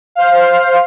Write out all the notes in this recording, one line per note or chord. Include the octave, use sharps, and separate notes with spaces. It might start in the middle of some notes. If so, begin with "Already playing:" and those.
C5 F5